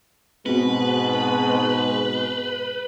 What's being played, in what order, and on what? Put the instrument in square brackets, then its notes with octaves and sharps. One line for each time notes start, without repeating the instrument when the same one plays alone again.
[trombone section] G#2 B2 [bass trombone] G#3 [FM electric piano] B3 C4 F#4 [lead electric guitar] B4